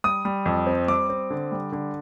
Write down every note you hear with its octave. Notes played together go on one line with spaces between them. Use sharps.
G3 D#6
G3
F2
C4
G3 D6
C4
D3
G3
D3